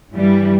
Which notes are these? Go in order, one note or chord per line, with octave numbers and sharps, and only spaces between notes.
G2 E3 G3